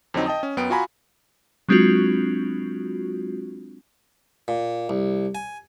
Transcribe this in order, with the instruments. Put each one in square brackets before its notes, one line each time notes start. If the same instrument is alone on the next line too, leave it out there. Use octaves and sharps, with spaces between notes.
[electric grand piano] F2 D3 F#3 C4 D#4
D#5 G5 A5 D#6
C#4
F#2 B3 G5 D7
F4 F#4 F5 G#5 A#5 B5
[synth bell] F#3 G#3 C4 D4 F4 F#4
[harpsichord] A#2
C2
G#5